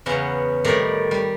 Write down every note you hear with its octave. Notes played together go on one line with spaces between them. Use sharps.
E2 C#3 B3 C#4 F#5 A#5
A2 D#3 G3 D5 A#5
G3